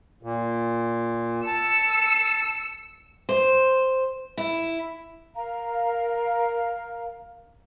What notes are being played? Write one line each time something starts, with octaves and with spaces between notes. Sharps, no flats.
A#2
A5 E6 C#7
C5
E4
A#4 F5 A#5